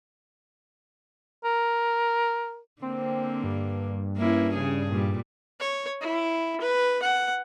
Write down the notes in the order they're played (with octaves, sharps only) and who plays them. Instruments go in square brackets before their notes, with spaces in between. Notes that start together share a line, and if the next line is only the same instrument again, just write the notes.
[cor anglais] A#4
[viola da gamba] D3 A#3 [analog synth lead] C4
[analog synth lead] G2
[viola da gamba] A#3 C#4 E4
C#3 G#4
A#2 G3
[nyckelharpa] C#5
E4
B4
F#5